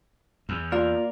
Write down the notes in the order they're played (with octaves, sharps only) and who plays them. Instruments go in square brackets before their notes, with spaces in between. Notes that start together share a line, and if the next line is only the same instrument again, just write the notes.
[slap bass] E2
[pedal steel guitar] A#3 A#4 [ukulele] F4 [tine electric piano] D5